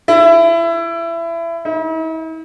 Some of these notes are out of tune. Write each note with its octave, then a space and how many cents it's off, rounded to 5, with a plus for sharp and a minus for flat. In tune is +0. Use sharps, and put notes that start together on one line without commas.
E4 +25
E4 -45